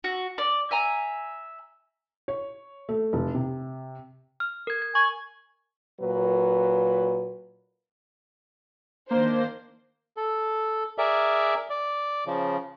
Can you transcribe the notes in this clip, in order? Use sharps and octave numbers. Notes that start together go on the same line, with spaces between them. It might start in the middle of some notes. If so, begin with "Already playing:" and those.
F#4
D5
E5 G#5 A#5
C#5
A3
F1
C3
F6
A#4 G#6
G#6
G#5 C#6
A#2 F#3 B4
D#3 A#3 D4 C5
A4
G#4 A#4 D5 E5
D5
C#3 F3